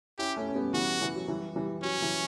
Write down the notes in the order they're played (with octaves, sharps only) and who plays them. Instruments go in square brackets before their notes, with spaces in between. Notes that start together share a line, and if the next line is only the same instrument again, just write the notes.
[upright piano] C#4 E4 [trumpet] G4
[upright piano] A3 C#4
C#4
G3 B3
[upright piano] E3 G3 [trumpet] F#4
[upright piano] E3
F#3
E3 G3
E3 G3
[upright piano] F#3 [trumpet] C#4
[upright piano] E3